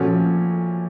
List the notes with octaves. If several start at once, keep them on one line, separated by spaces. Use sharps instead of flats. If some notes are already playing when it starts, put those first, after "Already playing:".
Already playing: A#2 F3 A3 C#4 F#4